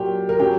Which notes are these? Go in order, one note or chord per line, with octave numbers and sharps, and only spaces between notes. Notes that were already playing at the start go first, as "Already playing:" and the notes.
Already playing: A#2 F#3 G4
A#4
C#3 F#3 G4